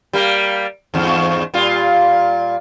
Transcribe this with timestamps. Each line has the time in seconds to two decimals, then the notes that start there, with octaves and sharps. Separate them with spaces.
0.13 G3 A#3 A#4
0.94 E2 G#2
1.54 A#2 G3 F4